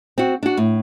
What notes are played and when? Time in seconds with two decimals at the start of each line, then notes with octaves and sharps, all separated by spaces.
0.18 C4 F#4
0.43 D4 F#4
0.57 A2